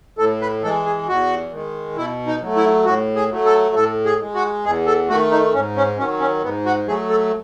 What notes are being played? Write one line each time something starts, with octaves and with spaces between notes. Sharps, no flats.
A2 A4
B4
E3 G#3 A4
G#4
E2 F#4
D#3 G#3
B2 E4
D#4
F#3 A3
E4
A2 F#4
G#4
F#3 A3
A4
A2 A4
G#4
G#3
F#4
E2 G#4
A4
D#3 A3 F#4
D#4
G#2 C#4
C#4
D#3 F#3 C#4
C#4
G#2 B3
F#4
F#3 A3 G#4
A4